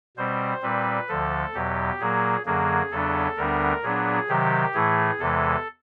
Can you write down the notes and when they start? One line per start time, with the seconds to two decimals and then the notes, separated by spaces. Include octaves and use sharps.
0.17 B2 G3 C4 C5
0.62 A#2 G3 C4 B4
1.09 D2 D3 F3 A4
1.54 E2 B2 F#3 G4
2.00 A#2 F#3 A#3 G#4
2.45 F#2 D3 F#3 A#3 G#4
2.91 E2 C#3 F#3 B3 D4 A4
3.37 D2 D3 G3 B3 D4 A#4
3.82 A#2 F#3 B3 D4 G#4
4.29 C3 D#3 F#3 G4
4.74 A2 E3 A3 G#4
5.19 E2 C3 E3 G#3 A4